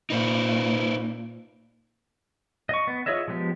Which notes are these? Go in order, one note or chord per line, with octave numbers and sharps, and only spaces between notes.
A#2 D#4 B4 C5
D#5 C#6
B3
F4 G#4 C#5 D#5 E5
F3 G#3 B3 G4